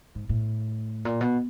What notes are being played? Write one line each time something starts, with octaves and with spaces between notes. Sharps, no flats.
G#2
A2
A#2
B2